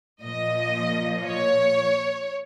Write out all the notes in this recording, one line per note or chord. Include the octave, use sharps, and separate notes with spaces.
A#2 F3 D#5
C#5